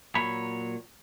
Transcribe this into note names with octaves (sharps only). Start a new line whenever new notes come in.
A#2 F#3 C#5 B5